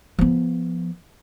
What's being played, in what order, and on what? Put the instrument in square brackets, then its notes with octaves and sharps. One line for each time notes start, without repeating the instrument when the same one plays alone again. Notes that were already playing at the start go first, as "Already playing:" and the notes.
[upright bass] F3 B3